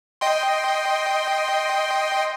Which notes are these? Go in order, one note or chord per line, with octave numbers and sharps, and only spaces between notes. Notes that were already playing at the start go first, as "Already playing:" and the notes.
D#5 G5 C6